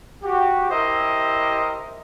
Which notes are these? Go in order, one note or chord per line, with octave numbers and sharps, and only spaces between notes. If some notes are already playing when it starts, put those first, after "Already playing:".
F#4 G4
E4 G4 A#4 C5 D#5 E5